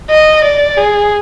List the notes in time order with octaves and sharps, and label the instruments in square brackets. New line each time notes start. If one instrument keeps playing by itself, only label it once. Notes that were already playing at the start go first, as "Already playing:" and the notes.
[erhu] D#5
D5
G#4